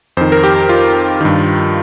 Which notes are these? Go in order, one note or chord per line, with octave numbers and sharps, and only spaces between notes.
F2 D#3 C5
A#4
G4
F4
G2 D#3